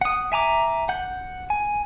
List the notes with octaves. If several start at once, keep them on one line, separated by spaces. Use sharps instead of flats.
F#5 D#6
E5 G#5 A#5 D6
F#5 G6
G#5